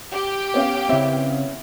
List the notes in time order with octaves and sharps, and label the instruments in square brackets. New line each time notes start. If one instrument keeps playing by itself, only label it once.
[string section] G4
[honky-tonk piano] B3 C#4 F5
[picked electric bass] C#3 C4 [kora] E4